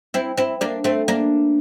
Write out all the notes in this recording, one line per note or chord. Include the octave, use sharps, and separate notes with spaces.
C4 E4
C4 E4
A#3 D4
A3 C4
A#3 D4